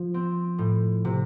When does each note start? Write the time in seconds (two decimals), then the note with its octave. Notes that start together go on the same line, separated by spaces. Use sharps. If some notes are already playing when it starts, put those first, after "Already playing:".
Already playing: F3
0.14 C4
0.58 A2
1.05 C3